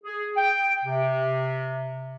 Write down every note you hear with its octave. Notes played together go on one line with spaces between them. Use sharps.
G#4
G5
C3